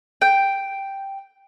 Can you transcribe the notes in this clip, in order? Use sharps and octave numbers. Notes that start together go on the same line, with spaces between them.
G5